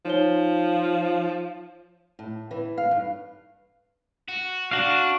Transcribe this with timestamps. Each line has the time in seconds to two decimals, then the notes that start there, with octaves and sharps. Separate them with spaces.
0.05 F3 D#4 C#5 G7
2.19 A2
2.51 E3
2.78 F5
2.91 G2
4.29 F#4
4.71 D4 F#4 F5